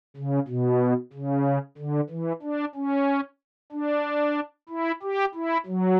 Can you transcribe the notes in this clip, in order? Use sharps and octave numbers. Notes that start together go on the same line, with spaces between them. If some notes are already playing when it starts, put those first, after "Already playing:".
C#3
B2
C#3
D3
E3
D4
C#4
D4
E4
G4
E4
F#3